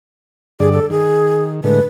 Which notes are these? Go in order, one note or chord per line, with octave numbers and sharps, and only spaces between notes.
G2 D3 G#4 D5
A4
D#3 G#4
A2 D3 G#3 B4